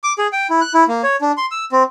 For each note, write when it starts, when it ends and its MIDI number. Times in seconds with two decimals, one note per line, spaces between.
0.04 0.13 86
0.18 0.27 68
0.33 0.47 79
0.50 0.61 64
0.61 0.72 90
0.74 0.84 64
0.88 1.02 58
1.03 1.16 73
1.21 1.32 62
1.37 1.46 84
1.51 1.65 88
1.72 1.83 60